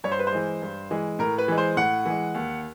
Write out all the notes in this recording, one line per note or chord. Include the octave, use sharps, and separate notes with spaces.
G2 C#5
C5
B4
C5
E3 G#3
G2
E3 G#3
A2 A#4
B4
E3 G#3
C5
A2 F#5
E3 G#3
D#2